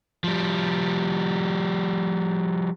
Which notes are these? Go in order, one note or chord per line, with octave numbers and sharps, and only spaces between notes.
F3 G3